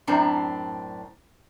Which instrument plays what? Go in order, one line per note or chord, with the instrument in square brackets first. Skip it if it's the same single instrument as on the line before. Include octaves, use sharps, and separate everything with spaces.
[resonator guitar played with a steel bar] F#2 A2 C4 D4 A#5